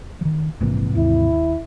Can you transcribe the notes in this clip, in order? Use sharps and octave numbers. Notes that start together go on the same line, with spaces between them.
D#3 F3
A#1 G#2 C3 E3 A#3
D#2 E4